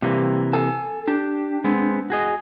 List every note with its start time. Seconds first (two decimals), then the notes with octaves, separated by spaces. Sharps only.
0.02 G2 C3 E3 A#3
0.53 A4 G#5
1.08 D4 G4
1.64 G#3 B3 C4
2.10 F#4 G#4 D#5